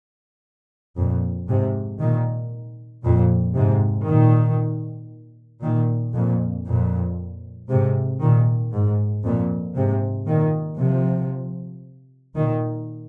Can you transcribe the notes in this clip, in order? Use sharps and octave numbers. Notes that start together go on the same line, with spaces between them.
F2 A#2
G#2 C3
A#2 D#3
F2 A#2
G#2 C3
A#2 D#3
A#2 D#3
F2 A#2
F2 A#2
G#2 C3
A#2 D#3
G#2
F2 A#2
G#2 C3
A#2 D#3
C3 F3
A#2 D#3